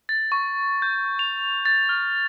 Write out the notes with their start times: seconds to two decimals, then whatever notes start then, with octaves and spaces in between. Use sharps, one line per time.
0.09 A6
0.32 C#6
0.82 G6
1.19 F7
1.65 A6
1.89 F6